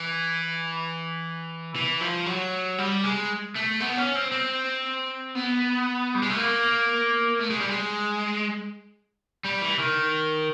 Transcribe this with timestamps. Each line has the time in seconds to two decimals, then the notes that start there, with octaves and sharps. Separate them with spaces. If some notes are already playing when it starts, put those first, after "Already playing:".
Already playing: E3
1.75 E3
2.01 F3
2.26 F#3
2.78 G3
3.04 G#3
3.56 A3
3.80 B3
3.97 C#4
4.15 C4
4.32 C4
5.35 B3
6.15 G3
6.22 G#3
6.30 A3
6.38 A#3
7.39 A3
7.50 G#3
7.61 G3
7.70 G#3
9.45 G3
9.61 E3
9.79 D#3